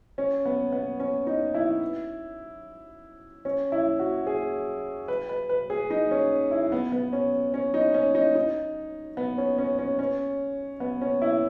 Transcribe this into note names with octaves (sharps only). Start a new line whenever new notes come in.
C#4
B3
B3
C#4
D#4
E4
C#4
E4
F#4
G#4
B4
B4
B4
G#4
D#4
C#4
E4
B3
B3
C#4
C#4
D#4
C#4
D#4
D#4
B3
C#4
C#4
C#4
C#4
B3
C#4
E4